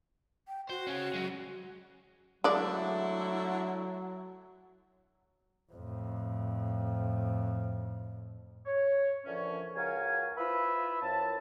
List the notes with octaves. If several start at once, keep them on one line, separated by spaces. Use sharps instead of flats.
G5
F#4 C5
C#4 G#4
F#3 G#3
D3 F#3 G#3 A3 E4 D5
F2 A2
C#5
A#2 D3 E3 F3 C#4
C#2 F#4 A#4 F5 G#5
E4 F4 B4 C5 E5
F#2 A5